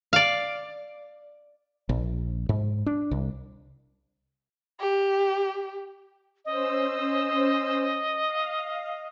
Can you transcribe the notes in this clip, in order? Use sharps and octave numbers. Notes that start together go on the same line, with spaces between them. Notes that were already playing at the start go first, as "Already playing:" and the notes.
D5 F5
A#1
G#2
D4
C2
G4
C#4 C5 D#5 E6
F5